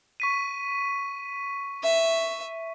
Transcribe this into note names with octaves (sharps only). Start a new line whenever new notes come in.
C#6 B6 D#7
E5